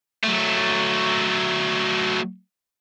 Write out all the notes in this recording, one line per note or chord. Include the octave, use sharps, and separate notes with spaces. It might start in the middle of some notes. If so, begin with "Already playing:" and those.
F#3 A3